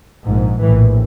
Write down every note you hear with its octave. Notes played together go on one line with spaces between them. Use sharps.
A#1 G#2
A#1 A2 E3